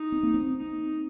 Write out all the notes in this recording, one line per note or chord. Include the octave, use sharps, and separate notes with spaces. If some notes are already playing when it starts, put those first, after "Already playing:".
Already playing: D#4
C4
A#3
C4
D#4